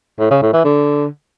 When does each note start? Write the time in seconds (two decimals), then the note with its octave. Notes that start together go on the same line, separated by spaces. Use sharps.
0.19 A2
0.31 C#3
0.42 A2
0.53 E3
0.65 D3